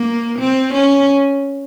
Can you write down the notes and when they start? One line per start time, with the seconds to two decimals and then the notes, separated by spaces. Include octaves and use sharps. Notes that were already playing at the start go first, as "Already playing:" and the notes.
Already playing: A#3
0.39 C4
0.74 C#4